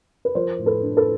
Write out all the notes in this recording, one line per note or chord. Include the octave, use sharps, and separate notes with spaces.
B4
F3 A#4 C5
A2
A4 B4
D4
A4 B4